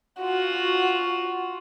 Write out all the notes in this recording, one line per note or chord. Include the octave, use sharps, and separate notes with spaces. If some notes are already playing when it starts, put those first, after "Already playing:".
F4 F#4